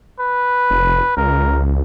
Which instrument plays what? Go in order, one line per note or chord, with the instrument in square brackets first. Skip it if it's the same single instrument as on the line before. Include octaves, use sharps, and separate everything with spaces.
[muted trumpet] B4
[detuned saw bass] F1
[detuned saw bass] C#2 [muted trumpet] A#4